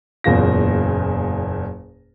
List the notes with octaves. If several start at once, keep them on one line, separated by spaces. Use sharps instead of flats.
F#1 E2 A#2 F4 A#6